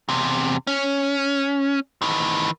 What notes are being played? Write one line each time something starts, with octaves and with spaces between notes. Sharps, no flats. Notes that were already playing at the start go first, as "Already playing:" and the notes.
E2 C3
C#4
D#3 E3